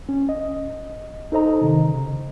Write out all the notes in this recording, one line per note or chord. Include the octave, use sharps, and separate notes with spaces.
C#4
D#5
D#4 A4 C5 D#5 A#5
C3 D#3
C#3